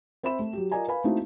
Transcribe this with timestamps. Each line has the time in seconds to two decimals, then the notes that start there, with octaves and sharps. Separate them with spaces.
0.23 C4 C5 E5 B5 E7
0.39 A3
0.53 F#3 G4
0.71 F4 A#4 D5 D#5 G#5 A#5
0.88 B4 F5 G#5 B5
1.04 A3 A#3 C4 D#4 E4 F#4